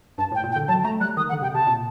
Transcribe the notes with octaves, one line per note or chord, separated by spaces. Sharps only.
G2 A5
A2 G5
A#2
G5
D3
F#3 A5
A3 A#5
G3 F#6
D#3 D#6
F#5
D3
C3 G5
C3 A5
A#2